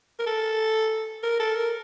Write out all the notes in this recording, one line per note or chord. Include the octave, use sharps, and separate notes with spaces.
A#4
A4
A#4
A4
A#4